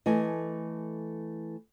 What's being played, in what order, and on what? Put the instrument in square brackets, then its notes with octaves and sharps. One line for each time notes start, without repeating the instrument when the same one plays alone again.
[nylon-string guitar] E3 A3 D#5 G#5